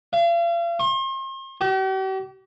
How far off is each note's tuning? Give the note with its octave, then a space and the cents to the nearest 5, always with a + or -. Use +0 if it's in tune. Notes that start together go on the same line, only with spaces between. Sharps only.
F5 -40
C6 +40
G4 -45